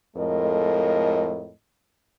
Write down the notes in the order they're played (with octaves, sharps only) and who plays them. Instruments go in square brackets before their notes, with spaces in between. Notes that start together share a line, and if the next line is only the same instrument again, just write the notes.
[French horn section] F2 A2 G#3 A#4 D#5